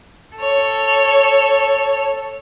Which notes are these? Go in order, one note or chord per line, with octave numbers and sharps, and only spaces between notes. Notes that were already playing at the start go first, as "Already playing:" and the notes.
A4 C#5